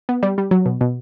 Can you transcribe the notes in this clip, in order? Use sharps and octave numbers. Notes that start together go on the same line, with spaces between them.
B3
G3
G3
F#3
B2
B2